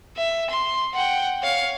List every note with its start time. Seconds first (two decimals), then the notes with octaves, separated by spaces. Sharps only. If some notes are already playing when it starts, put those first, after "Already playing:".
0.17 E5
0.50 C6
0.94 F#5 G5
1.42 C#5 F5